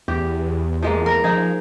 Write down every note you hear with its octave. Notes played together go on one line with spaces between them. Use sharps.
E2 G4
F3 G#3 A#3
A#4
F3 D#4 G#4